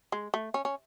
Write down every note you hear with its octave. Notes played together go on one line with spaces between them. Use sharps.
G#3
A3
C#4
C#4